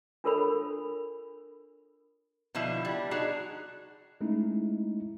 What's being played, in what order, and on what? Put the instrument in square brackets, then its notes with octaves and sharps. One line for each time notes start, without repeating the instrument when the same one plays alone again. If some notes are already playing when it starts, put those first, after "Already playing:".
[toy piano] D4 F4 A4 A#4 C#5 B5
[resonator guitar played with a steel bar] B2 D3 F3 E4
G3
D4 D#4 F#4 G#4
[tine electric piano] G#3 A3 C#4 D#4 E4